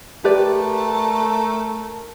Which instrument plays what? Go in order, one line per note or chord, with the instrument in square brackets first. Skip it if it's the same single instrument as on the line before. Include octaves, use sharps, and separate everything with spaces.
[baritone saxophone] A3 [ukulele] G4 B4 D5 [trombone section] A#4 [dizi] A5